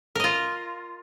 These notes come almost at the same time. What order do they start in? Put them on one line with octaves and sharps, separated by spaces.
A#4 D#5 F4